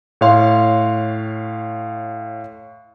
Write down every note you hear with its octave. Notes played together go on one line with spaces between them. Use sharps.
A2 C#5 F5 C6